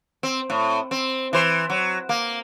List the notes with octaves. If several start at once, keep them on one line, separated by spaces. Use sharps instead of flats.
C4
A2
C4
E3 C5
F#3
A#3